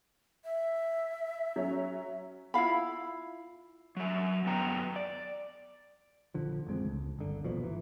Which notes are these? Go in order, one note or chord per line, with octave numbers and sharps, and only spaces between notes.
E5
F#3 C#4
E4 F4 F5 B5
F#3 E5
F#2 B3 G5 A#5
D5
A#1 D3 F3
A1 F2 G#3 C4
C#2
G1 D3
D#1 A#1 B2 F3
G#1 E3